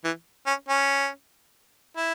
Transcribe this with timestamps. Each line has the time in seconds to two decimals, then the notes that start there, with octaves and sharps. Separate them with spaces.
0.04 E3
0.47 C#4
0.69 C#4
1.97 E4